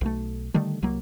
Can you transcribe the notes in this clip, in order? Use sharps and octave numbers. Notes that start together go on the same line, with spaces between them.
B1 A3
D3 D#3 G3 A3
C2 F#3 A#3